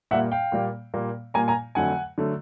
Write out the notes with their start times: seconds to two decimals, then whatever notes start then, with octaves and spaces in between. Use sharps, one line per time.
0.11 A#2 G3 A#3 E5 F#5
0.32 F5 G5
0.52 A#2 G3 A#3
0.94 A#2 G3 A#3
1.34 A#2 G3 A#3 G#5 A#5
1.48 G#5 A#5
1.75 F2 D3 F#3 A3 F#5 G#5
2.18 D3 F#3 A3